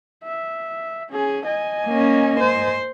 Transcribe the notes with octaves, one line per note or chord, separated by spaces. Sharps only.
E5
C#4 G#4
D#5 G#5
A#3 C#4
C5